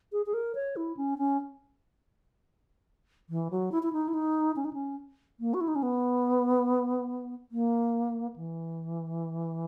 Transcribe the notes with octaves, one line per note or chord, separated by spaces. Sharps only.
G#4
G#4
A#4
C#5
E4
C#4
C#4
E3
F#3
E4
E4
D#4
E4
D#4
C#4
D#4
C#4
A#3
F#4
E4
D#4
C#4
B3
A#3
E3